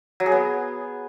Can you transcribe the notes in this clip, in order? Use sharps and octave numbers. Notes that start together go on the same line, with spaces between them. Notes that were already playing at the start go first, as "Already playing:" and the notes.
F#3
G#4
B3